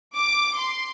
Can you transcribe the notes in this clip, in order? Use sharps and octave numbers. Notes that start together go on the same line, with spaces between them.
D6
C6